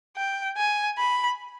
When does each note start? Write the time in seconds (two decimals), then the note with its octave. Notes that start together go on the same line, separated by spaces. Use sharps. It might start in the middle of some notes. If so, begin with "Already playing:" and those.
0.16 G5
0.57 G#5
0.98 B5